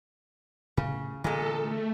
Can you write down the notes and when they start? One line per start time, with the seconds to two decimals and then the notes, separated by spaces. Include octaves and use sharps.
0.77 A2 C#3
1.24 A#2 D3 E3 G#3 B3 A4
1.61 A3